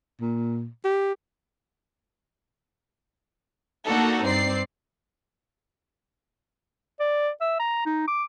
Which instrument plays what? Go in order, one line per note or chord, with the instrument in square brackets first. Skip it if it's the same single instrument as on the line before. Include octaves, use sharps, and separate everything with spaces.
[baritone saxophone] A#2
G4
[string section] A#3 D4 D#4 F#4 A4
G2 C4 D5 C7
[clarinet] D5
E5
A#5
D#4
D6